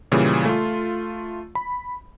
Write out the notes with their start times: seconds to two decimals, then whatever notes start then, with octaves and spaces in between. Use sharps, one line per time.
0.12 A#2 C#3 E3 G3
0.45 A3 F4
1.55 B5